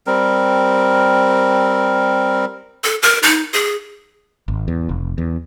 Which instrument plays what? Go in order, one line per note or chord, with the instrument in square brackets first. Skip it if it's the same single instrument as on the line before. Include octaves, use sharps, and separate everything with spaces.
[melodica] G3 C4 A#4
[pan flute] A4
A#4
D#4
G#4
[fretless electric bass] G#1
E2
F1
E2